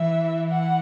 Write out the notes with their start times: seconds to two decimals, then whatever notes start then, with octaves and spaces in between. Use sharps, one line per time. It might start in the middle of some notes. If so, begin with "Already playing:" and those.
Already playing: E3 E5
0.50 F#5